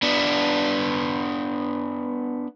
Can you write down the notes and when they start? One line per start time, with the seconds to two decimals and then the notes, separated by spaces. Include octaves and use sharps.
0.03 B3 D4